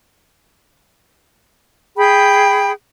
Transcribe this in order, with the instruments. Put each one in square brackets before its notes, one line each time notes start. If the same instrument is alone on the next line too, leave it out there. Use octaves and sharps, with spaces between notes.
[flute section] G#4 G5 B5